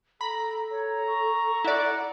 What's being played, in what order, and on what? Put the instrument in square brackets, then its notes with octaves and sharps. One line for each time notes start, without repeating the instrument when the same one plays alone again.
[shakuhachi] A4 [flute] A#5 [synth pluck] B5
[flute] C#5 [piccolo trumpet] A#5
[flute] C#6
[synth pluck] E4 D5 [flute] F#5